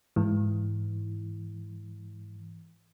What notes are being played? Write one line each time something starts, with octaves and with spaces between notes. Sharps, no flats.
G#2 E3